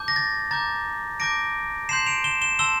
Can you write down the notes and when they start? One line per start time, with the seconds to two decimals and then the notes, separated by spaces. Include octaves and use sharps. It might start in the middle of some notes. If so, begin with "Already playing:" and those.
Already playing: A5 D6 G6
0.08 A#6
0.16 A6
0.51 A#5 D6 G6 A6
1.20 A5 D6 G6 A#6 D7
1.89 A5 C6 G6 C7 E7
2.07 D7 F7
2.24 E7 G7
2.41 E7 G7
2.59 A5 C6 E6 E7 G7